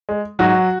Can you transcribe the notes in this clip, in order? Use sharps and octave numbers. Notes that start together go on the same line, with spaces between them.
G#3
G#2 F#3 F#4